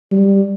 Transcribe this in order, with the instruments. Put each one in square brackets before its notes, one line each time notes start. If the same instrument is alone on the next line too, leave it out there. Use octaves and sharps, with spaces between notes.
[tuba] G3